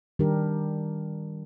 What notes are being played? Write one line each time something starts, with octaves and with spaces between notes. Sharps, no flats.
D#3 G3 D4 G4 A#4